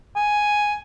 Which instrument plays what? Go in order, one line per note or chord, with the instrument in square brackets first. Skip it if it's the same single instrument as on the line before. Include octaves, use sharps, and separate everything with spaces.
[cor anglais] G#5